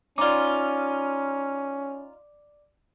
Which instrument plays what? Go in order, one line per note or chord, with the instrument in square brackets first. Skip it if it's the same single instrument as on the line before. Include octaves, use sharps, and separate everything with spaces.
[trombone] C#4 [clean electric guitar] D#4 F4 [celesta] D5 D6